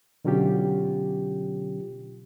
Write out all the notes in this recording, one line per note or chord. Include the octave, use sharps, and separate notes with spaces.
B2 D3 F#3 C#4 F4 G4